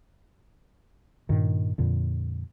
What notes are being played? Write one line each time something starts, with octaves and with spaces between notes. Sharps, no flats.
G2 A#2 D#3
F2 A#2 D3